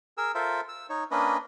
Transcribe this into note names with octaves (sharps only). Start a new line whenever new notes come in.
G#4 A#4 E6
F4 A4 A#4 C5 E5
E6
D#4 C#5
A#3 C#4 D4 B4 D#5